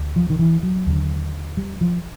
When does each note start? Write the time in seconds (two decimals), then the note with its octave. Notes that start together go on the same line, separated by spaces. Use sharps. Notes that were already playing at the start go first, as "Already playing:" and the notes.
Already playing: D2
0.16 F3
0.30 D#3
0.39 E3
0.63 F#3
0.86 D#2 D3
1.57 G3
1.81 F3